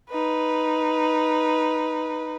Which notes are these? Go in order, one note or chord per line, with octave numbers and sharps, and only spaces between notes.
D#4 B4